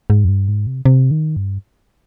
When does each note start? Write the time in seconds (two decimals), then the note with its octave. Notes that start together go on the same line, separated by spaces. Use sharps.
0.10 G#2
0.25 F2
0.29 G2
0.48 G#2
0.67 C3
0.85 C3
1.11 D#3
1.36 G2